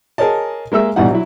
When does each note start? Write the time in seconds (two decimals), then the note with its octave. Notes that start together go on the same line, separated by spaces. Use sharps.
0.18 G#4 A#4 C#5 D#5 A5
0.72 G#3 A#3 E5 E6
0.96 A#1 B2 E3 G3 D#4 F#5
1.11 F#3 E4